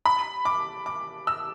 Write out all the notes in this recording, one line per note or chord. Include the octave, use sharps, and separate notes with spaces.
B5
D6
D6
E6